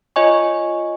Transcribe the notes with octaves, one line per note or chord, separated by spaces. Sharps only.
F4 C#5 D#5 G#5 C#6